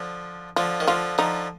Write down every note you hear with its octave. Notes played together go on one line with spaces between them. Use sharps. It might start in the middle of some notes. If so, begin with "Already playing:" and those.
Already playing: D3 F3
D3 F3 F4
D#3
D3 F3 F4
D3 F3 D#4